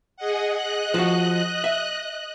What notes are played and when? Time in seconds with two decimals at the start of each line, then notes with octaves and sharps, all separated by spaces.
0.16 G#4 D#5 F#5
0.55 D#5 F#6
0.94 F3 F#4
1.64 E5